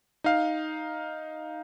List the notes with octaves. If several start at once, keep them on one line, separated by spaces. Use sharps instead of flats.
D#4 F5